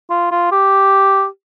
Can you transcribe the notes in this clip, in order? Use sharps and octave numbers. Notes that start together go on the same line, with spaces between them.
F4
F4
G4